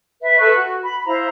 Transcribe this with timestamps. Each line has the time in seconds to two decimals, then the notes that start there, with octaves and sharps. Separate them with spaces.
0.22 B4 E5
0.38 A4 B4 C#6 F#6
0.55 F#4
0.84 B5
1.06 E4 C5 F5 A#5